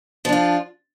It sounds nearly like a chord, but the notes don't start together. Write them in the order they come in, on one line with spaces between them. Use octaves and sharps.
F3 D4 F4